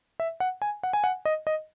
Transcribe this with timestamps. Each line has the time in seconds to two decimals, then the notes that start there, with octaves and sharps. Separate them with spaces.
0.20 E5
0.40 F#5
0.62 G#5
0.83 F#5
0.93 G#5
1.04 F#5
1.25 D#5
1.47 D#5